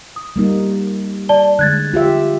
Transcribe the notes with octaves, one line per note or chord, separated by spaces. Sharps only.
D#6
G3 A#3 D#4
D5 A5 G7
D3 G#3 F#6 G#6 A6
F4 G4 E5